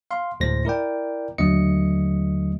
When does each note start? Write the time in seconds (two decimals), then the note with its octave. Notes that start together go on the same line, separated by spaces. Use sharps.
0.11 F5 C6
0.40 D2 A2 G#3 C5 A#6
0.65 E4 A#4 D5 G5
1.38 D#2 D3 F#3 A3 D#5 C#7